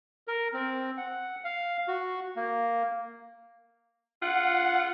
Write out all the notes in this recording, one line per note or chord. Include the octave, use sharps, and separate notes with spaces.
A#4
C4
F#5
F5
F#4
A#3
F4 F#5